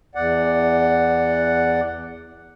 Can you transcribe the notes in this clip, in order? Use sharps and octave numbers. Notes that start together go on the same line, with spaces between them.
E2 D5 F#5